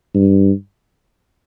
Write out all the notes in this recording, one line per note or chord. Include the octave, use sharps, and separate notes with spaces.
G2